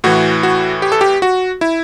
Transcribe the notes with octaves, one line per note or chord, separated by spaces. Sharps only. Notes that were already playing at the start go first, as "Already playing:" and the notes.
A2 E3 F#4
F#4
G4
A4
G4
F#4
E4